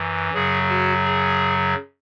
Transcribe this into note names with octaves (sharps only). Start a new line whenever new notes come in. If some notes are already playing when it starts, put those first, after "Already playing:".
Already playing: F#2 E3
F#2 C#3 F#3 G#4
F#4
G#4